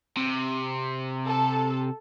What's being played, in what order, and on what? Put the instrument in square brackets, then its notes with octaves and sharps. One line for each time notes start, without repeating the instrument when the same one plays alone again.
[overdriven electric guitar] C3
[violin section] A4